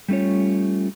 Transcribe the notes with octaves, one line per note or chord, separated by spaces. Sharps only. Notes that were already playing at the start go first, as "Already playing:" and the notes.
G3 A3 C#4 F4 C#5